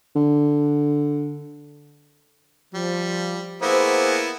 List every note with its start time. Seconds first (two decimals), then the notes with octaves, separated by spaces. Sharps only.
0.16 D3
2.74 F3 G3
3.62 A#3 B3 E4 G#4 C5